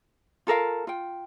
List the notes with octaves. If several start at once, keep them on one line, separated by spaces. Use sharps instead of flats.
F4 A4 A#4 F5
F4 G5